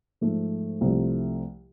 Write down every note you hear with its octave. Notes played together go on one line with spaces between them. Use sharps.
G#2 F3 A3
C2 C3 F3 A3